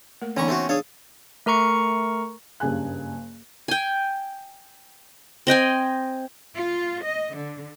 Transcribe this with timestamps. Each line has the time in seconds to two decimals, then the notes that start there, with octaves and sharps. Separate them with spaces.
0.22 A3 A#3 A#4
0.37 D3 E3 B3 C#4 D#4 A#5 C#6
0.48 A3 C4 F#4
0.69 D4 G#4 A4 C#5 F5
1.46 A3 A#4 A#5 C#6 C#7
2.60 F#1 G2 C#3 G#4 G#5 F#6
3.68 G5 G#5
5.47 C4 D#5 G5 G#5
6.55 F4
7.02 D#5
7.34 D3